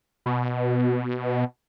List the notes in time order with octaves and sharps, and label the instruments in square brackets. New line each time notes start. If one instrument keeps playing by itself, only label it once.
[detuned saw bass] B2